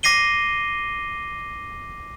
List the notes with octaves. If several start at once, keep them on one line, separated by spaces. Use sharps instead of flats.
D6 A#6 C7 D#7 G7